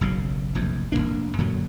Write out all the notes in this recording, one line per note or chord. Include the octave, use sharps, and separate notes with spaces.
F#1 B1 C#3
F1 A#1 E2
F1 F#2 A#3 D4
F#2 A#2 D3 F#3